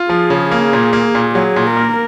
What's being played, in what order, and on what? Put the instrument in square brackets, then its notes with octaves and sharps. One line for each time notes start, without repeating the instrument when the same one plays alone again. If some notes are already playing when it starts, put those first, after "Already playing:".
Already playing: [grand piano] F4
[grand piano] F3 [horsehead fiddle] G#4
[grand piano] C#3
A#3
A#2
A#3
A#2
[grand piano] F#3 [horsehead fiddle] G#4
[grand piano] A#2
[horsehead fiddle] A#4
[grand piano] A#3